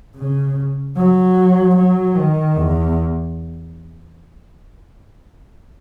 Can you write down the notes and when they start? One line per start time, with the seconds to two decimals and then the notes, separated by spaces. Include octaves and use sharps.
0.16 C#3
0.96 F#3
1.76 F#3
2.16 D#3
2.56 E2